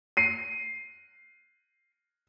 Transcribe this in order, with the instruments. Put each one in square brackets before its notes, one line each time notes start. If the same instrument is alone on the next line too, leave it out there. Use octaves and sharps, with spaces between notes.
[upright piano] C7 D#7